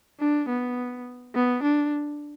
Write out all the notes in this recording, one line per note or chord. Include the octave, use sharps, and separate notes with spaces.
D4
B3
B3
D4